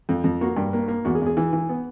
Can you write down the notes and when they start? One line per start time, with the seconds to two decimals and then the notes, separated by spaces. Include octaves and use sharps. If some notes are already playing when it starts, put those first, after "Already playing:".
0.09 F2
0.24 F2
0.41 A#3 F#4
0.57 G2
0.73 A#3
0.88 A#3
1.05 E2 F#4
1.15 G#4
1.21 E2
1.26 G#4
1.37 E3
1.53 E3
1.69 B3